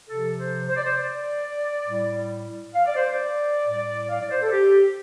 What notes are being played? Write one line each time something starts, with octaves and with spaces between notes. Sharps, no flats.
C3 F3 A4
C5
C5
D5
C5
D5
A2 G3
F5
D5
C5
D5
A2 G3
F5
D5
C5
A4
G4